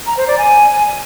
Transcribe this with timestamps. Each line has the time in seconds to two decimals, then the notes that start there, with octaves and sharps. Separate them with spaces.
0.07 A#5
0.17 C5
0.28 D5
0.38 G#5